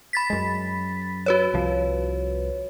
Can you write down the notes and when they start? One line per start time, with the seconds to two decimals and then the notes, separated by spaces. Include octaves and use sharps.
0.13 B5 A6 B6
0.30 F#2 G#3
1.26 F#4 B4 C#5
1.54 C2 F3